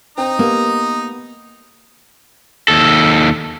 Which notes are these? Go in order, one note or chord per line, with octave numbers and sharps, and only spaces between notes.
C4 D#4 G5 A#5 D#6
A#3 B3 G4
D#2 A4